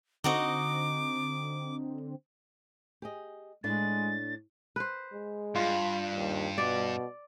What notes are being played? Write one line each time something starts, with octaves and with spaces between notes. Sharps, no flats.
D3 C4 D#4 F#4 D#5 D6
G4 G#4 D#5
A2 G#3 D4 A6
B4 C5
G#3
G2 F4
D#2
B2 D5